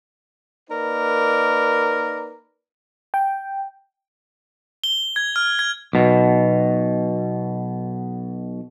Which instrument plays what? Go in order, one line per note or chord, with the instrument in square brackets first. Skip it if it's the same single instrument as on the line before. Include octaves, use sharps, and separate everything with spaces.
[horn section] A#3 D#4 A#4 B4 D5
[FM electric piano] G5
[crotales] G7
G#6
F6
G#6
[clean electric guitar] B1 B2